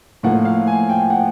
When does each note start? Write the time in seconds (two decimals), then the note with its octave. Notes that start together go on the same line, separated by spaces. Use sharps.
0.23 A2 F3 A#3 F#5
0.45 F5
0.67 G#5
0.89 G5
1.10 F#5